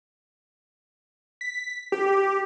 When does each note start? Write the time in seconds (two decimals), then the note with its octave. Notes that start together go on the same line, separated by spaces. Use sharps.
1.41 B6
1.92 G4